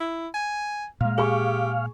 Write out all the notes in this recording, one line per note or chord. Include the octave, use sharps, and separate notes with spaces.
E4
G#5
A#2 G#3 F5
G4 G#4 C#6